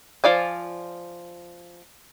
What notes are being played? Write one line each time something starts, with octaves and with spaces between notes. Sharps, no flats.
F3 F4 D5 G#5